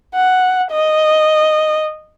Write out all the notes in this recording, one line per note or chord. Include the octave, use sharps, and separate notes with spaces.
F#5
D#5